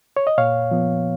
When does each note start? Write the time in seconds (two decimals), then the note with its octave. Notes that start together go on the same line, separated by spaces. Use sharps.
0.17 C#5
0.27 D#5
0.38 A#2 C#5 F5
0.71 F3 B3